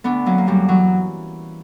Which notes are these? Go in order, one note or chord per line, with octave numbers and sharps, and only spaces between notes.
D2 B3 D4
F#3 A#3 C#4
A#3
F#2 G3
E3 F#3